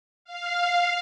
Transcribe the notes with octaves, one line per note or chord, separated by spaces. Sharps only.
F5